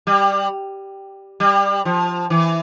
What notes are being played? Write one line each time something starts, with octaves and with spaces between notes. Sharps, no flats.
G3
G3
F3
E3